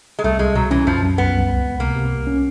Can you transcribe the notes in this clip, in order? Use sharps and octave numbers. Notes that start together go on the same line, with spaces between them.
G#3
C2 A3
C2 G#3
B2 F#3
E3 C#4
F#2 F3
F#2
C2 B3
C2
C#2
C#2
C3 A#3
C3
C2
C#4